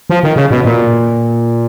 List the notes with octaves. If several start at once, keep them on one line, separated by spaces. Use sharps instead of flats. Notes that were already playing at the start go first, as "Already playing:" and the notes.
F3
D#3
C#3
B2
A#2